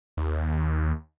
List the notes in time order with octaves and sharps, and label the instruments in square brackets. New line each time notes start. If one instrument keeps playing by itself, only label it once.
[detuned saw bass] D#2